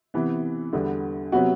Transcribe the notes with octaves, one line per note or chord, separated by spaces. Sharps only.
C3 E3 B3
E2 D3 G3 B3
C3 F#3 B3 F#4